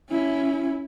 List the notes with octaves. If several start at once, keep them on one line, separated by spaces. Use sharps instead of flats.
C#4 E4